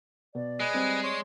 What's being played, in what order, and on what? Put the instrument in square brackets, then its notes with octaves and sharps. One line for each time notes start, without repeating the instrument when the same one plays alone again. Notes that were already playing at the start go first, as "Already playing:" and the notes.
[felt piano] B2 [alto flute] D5
[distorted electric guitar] G#3 [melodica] B4 D#5 G#5
[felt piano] G3 C4
[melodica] C#5 C6